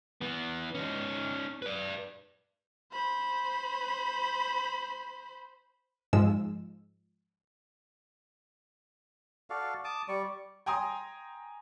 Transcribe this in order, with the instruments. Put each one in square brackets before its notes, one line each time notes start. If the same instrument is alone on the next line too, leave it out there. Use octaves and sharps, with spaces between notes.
[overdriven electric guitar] E3 B3
C#4 D#4
B4 D5
[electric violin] C5 B5
[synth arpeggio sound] G#2 F3 G#3 E6
[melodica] F#4 A4 D5 F5
A5 D6 D#6
G3 D5 C#6
[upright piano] G5 G#5 A#5 C6 D#6